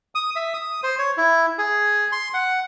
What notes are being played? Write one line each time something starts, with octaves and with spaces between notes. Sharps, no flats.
D#6
E5
D#6
C5
C#5
E4
G#4
C6
F#5